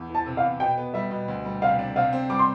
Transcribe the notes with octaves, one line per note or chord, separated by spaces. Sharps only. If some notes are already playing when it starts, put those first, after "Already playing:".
Already playing: E2
E3
A5
C3
F5
E2
B2 G5
B3
G3 E5
B2
D2
G3
C3 F5
D4
C3 F5
C4
G3 D6
C6